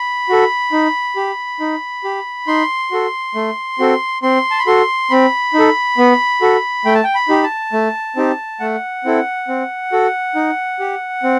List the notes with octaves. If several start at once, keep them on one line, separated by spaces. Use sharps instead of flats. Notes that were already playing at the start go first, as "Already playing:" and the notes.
Already playing: B5
F#4 A4
D#4
G4
D#4
G4
D#4 C6
F#4 A4
A3
C4 F#4 A4
C4 C6
A5
B5
F#4 A4 C6
C4 B5
D#4 A4
B3
F#4 A4
A3 G5
A5
G5
B5
D#4 G4
A5
A3
C4 D#4 G4
A3 F#5
C4 E4 A4
C4
F#4 A4
D#4
G4
C4